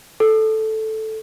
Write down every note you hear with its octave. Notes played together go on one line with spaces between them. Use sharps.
A4